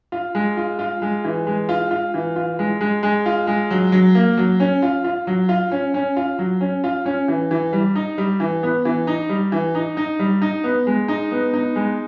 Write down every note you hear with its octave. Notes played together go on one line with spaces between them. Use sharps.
F4
G#3
F4
F4
G#3
E3
G#3
F4
F4
E3
F4
G#3
G#3
G#3
F4
G#3
F#3
F#3
A#3
F#3
C#4
F4
F4
F#3
F4
C#4
C#4
F4
F#3
C#4
F4
C#4
E3
E3
G3
D#4
G3
E3
B3
E3
D#4
G3
E3
D#4
D#4
G3
D#4
B3
G#3
D#4
B3
D#4
G#3